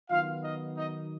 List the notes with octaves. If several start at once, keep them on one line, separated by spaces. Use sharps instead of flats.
D#3 F#3 B3 F4 F5
D#4 D#5
D#4 D#5